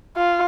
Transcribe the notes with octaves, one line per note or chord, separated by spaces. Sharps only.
F4